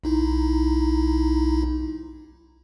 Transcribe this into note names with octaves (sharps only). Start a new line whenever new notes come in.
B1 D#4 E4